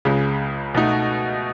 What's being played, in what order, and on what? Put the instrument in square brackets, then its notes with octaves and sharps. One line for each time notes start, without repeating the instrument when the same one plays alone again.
[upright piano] C#2 C#3 G#3
B2 A3 D#4 F#4